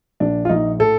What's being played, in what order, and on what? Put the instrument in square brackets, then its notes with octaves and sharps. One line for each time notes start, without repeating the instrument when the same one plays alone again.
[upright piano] A#1 D4
F4
A#1 D#4
A2 A4